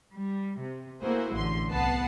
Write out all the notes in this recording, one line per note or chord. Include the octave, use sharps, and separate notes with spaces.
G3
C3
A3 A#3 E4 F#4 G#4 C5
A1 D3 C6
C2 B3 B4 F#5 A5 C7